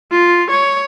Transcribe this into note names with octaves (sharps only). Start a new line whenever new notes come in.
F4
C#5